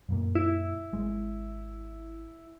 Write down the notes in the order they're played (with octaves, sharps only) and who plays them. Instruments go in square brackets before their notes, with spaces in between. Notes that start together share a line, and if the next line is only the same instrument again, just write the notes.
[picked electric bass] F#2 A#2 A#3
[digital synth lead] E4
[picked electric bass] G#1 G#3